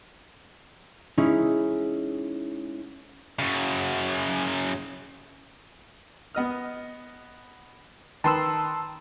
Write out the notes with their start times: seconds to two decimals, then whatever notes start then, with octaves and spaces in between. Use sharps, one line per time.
1.17 G#3 C#4 D#4 E4
3.39 F#2 C#3
6.35 B3 D#5 F6
8.24 D#3 B4 G5 A5 C6 E6